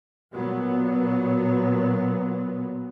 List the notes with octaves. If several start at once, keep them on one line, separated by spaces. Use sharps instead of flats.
A#2 F#3 B3